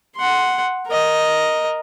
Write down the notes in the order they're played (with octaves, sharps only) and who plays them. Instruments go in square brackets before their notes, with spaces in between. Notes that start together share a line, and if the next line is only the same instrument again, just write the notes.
[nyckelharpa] F#5 C6
A#4 D#5